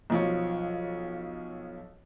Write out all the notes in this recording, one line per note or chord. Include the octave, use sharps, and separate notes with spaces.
B1 F3 C#5